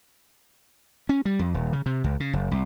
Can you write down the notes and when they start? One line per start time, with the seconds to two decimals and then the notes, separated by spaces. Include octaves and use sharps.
1.09 C#4
1.25 G3
1.39 F2
1.54 D#1
1.73 C#3
1.86 C3
2.04 C#2
2.20 C#3
2.33 F#1
2.51 C2